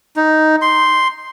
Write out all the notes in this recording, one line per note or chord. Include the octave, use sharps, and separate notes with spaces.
D#4
C6